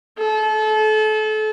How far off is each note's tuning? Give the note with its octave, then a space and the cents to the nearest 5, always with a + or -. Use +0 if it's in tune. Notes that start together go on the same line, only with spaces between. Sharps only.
A4 -30